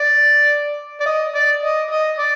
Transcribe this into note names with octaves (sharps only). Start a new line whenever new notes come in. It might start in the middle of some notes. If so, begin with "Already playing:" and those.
Already playing: D5
D5
D#5
D5
D#5
D#5
D5